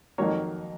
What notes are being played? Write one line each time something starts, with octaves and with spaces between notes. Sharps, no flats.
F2 D#3 F#3 A#3 C#5